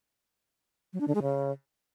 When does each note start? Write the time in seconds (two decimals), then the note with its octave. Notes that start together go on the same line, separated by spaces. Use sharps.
0.93 F#3
1.00 D4
1.08 D3
1.15 G#3
1.22 C#3